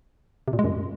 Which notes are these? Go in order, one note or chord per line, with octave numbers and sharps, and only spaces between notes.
C3
A#2
G#3
F#2